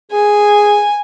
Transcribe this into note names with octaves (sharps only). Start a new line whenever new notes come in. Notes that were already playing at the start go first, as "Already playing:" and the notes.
G#4 G#5